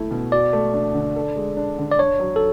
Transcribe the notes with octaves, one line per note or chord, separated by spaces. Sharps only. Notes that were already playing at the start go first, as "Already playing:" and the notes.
Already playing: A3 E4 A4
B2
F#4 D5
A3
D4
D3
A4
G#3
D4
D3
D5
D4 C#5
F#3
A4